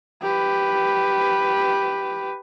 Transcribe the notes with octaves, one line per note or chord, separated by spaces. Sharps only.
G4 B4